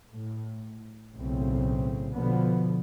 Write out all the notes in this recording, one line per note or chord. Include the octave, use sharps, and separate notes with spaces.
A2
B1 A2 C#3 C4
B2 D3 F3 B3